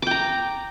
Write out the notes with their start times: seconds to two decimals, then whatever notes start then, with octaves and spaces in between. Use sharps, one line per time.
0.02 D6
0.07 G5
0.11 A#5